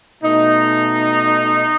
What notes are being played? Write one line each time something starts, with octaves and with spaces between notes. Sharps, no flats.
B2 A3 D#4